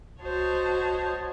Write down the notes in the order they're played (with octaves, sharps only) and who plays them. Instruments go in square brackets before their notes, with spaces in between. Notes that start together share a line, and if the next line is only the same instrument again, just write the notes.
[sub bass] C2 [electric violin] F#4 D#5 [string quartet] C5 C#5 A5